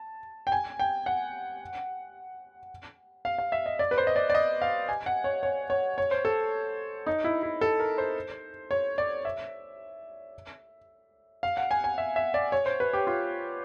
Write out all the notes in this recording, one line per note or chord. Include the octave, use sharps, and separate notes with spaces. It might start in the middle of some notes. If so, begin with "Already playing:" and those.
Already playing: A5
G5
G#5
G5
F#5
F5
F5
E5
D#5
D5
B4
C5
D#5
D5
D5
D#5
F5
G#5
F#5
C#5
C#5
C#5
C#5
C5
A4
D#4
E4
E4
A4
A#4
C5
C#5
D5
E5
F5
F#5
G#5
G#5
E5
E5
D5
C#5
C5
B4
G4
F4